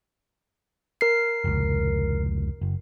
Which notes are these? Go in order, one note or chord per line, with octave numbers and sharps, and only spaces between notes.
A#4 C7
F1 C#2
F#1